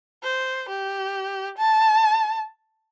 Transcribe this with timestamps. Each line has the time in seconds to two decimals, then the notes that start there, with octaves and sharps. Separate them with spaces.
0.23 C5
0.69 G4
1.58 A5